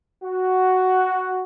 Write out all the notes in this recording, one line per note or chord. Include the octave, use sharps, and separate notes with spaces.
F#4